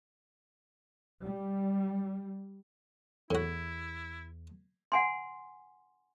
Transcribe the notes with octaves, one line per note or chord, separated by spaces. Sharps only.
G3
E2 A2 E4 F#4
F#5 G#5 C6